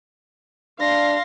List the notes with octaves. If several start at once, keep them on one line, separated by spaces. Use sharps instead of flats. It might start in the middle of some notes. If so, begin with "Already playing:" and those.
D4 F5 C6 A#6